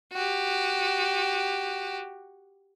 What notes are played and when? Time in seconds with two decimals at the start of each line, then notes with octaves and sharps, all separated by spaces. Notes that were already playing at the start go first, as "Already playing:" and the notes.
0.13 F#4 G4